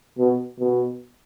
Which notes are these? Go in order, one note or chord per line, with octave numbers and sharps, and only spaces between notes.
B2
B2